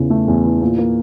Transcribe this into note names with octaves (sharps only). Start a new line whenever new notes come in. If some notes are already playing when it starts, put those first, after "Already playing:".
Already playing: E2 C#3 E3
A3
E2
E3
A#2
A#3